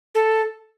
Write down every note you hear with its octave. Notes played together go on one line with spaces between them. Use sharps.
A4